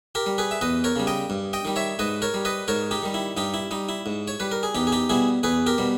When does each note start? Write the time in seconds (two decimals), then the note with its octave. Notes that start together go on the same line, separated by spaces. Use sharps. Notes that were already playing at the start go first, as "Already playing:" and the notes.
0.15 G4 A#4
0.26 G3
0.38 G#4 B4
0.51 E5
0.61 E2 B4 D#5
0.84 A#4 C#5
0.96 C#3 G3
1.07 D#5 G5
1.30 G2
1.53 D#5 G5
1.65 D#3 G3
1.76 C#5 E5
1.99 G#2 B4 D#5
2.22 A#4 C#5
2.34 G3
2.45 B4 D#5
2.68 G#2 A#4 C#5
2.91 D#4 G4
3.02 D#3 G3
3.14 E4
3.37 G2 D#4 G4
3.54 E4
3.71 G3 D#4
3.89 E4
4.06 G#2
4.28 C#5
4.40 G3 B4
4.52 A#4
4.63 G#4
4.75 E2 D#4 G4
4.87 G#4
4.92 D#4 G4
5.10 B2 G3 E4 G#4
5.43 E2 G#4 B4
5.66 G4 A#4
5.78 B2 G3